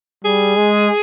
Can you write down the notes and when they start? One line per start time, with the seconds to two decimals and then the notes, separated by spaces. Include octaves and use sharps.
0.24 G3 G#4
0.57 G#3